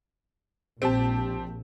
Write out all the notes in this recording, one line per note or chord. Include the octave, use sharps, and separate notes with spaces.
A#1 C4 G4 A5